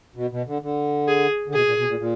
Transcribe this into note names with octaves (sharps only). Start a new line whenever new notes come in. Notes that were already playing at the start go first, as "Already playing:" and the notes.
B2
B2
D3
D3
G#4
D3
B2 G#4
A#2
B2
A#2
A#2